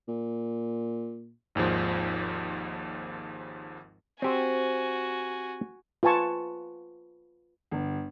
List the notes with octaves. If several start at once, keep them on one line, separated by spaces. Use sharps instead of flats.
A#2
G#1 D#2 G#2 F3
C4 F#4 G4 C5 G#5
F4 B4 G#5 A5 C#6
G1